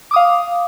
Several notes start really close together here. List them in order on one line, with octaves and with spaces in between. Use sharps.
D6 D#6 F5